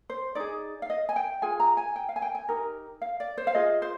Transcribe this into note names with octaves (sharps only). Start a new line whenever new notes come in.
C5
D#4 G#4 D5
F5
D#5
G#5
G5
F4 G#4 G#5
A#5
G#5
G5
F5
G#5
G5
G#5
D#4 G4 A#4
F5
D5
C5
F5
F4 G#4 D#5
C5